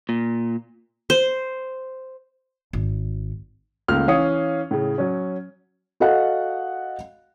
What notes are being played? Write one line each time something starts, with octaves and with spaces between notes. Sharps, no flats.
A#2
C5
G#1
C#2 A3 A#3 F4 F6
E3 C#4 F5 D#6 C#7
A2 C#3
F#3 C#4
F#4 A4 D#5 F5 F#5